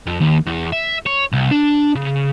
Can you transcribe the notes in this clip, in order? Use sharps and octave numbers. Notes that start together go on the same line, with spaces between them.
F2
D#2
E2
E5
C#5
C2
D4
C#3